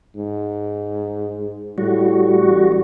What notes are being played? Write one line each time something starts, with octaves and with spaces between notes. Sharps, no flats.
G#2
A2 G3 F#4
A1